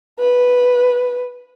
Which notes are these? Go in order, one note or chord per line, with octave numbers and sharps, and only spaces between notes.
B4